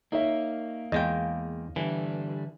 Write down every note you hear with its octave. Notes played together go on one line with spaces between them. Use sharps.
A#3 D#4 C#5 E5
E2 G#3 D#5 F5 G5
D3 E3 G3 D4